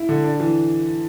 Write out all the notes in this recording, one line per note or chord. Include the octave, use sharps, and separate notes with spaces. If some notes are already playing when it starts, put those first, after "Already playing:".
Already playing: E4
D3
D4
E3